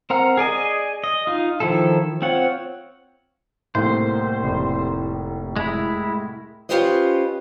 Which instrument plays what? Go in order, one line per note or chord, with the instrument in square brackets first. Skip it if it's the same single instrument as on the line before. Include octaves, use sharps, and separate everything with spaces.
[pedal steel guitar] C4 A#4 F#5 A#5 F6
G#4 D5 D#5 G#5
D#5
D#4 F4
D#3 F3 E4 A4
C4 F4 C#5 F#5
[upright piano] C2 A2 A#3 [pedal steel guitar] C5
[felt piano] F1
[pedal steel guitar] G#3 E4
[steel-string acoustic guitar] C#4 F4 G4 B4 C5 D#5